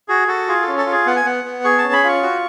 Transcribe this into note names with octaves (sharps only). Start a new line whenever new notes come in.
F#4 G#4
F#4 A4
F4 G#4
A4
C#4
A4
F4
G#4
B3 F#5
G#5
B3 F#5
B3
G#4 C#6
A5
C#4
B5
F4 C#6
F#4